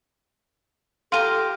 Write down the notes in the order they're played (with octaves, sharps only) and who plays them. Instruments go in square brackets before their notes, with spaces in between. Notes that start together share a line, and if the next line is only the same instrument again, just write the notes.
[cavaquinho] F4 G4 A#5 [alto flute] A4 [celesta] C6 F6 D#7